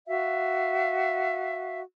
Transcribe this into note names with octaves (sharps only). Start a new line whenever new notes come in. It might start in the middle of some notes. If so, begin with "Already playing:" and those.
F#4 E5 F5